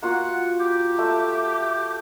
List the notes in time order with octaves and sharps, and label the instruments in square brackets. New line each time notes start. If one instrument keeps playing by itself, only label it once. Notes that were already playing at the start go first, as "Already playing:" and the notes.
[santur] A#3 F4 F#4 [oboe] F#5
[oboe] G4
[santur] A3 E5